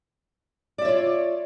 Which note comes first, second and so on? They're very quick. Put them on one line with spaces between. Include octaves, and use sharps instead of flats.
D5 E5 C#5 F4